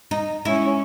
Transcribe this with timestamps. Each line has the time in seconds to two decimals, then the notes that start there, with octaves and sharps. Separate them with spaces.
0.11 D#4
0.45 G#3 C#4 E4